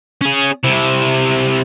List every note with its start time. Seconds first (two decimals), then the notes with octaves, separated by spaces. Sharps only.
0.21 C#4 G#4
0.64 C3 E4